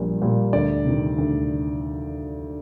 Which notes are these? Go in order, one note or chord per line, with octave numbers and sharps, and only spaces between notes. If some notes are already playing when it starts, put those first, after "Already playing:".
Already playing: A#1 A#2 G3 A#3
A#2 G3 A#3
D2 D5
C3 D#3
D2